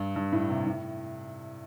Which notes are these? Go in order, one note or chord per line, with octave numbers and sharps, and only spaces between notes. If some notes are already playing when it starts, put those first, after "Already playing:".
Already playing: G2
G2
A2
C3
A2